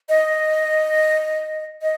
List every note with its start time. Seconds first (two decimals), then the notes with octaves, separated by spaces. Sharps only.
0.09 D#5
1.82 D#5